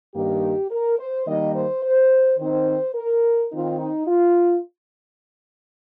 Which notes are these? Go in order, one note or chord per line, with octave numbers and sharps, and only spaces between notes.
G2 D#3 A#3 D#4 G4
A#4
C5
D#3 G3 A#3 D#4 D#5
C5
C5
D#3 C4 D#4 C5
A#4
D#3 C4 D#4 F4
D#4
F4